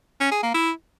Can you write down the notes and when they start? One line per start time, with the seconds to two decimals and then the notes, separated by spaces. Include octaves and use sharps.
0.20 C#4
0.32 G#4
0.43 A#3
0.54 E4